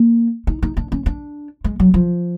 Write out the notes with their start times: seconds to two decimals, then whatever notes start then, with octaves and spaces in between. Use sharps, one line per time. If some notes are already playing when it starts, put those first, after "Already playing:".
Already playing: A#3
0.47 D#4
0.63 D#4
0.77 D4
0.92 C#4
1.06 D4
1.64 G#3
1.80 F#3
1.94 F3